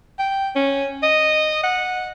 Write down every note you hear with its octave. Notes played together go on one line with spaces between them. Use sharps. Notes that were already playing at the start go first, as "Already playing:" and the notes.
G5
C#4
D#5
F#5